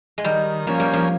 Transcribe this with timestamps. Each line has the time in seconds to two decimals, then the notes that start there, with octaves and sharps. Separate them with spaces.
0.18 G#3
0.24 D#3 G3
0.67 F3 A#3 C#4
0.80 G3
0.93 F3